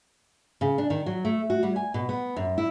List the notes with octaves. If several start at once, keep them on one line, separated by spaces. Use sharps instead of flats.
C#3
D4
D#3
F#3
A3
F#4
G3
G#5
B2
B3
F#2
E4